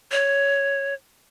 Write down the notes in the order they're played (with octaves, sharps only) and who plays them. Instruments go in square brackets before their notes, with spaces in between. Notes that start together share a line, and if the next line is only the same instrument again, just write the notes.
[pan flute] C#5